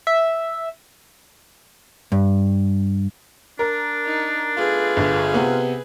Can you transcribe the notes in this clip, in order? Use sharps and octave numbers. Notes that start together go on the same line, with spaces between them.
E5
G2
D4 A#4
D#4
B2 A3 F4 G#4 B4
G1 D3
C3 B3